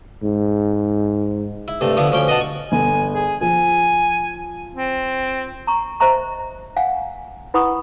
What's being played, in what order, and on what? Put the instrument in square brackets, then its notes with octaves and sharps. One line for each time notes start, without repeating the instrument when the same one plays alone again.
[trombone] G#2
[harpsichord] E4
G2 C3 A3
D3 F3 B3 E4
D2 F3 C#4 G5
B2 D#5 F#5 A5
C#6
[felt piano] G1 [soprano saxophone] G#5
[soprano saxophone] G#4
[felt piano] F3 [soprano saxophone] G#5
[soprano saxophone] C4
[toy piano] A#5 C#6
C5 D#5 E5 A#5 C#6
F5 F#5 G#5
E4 B4 F#5 B5 C#6 D#6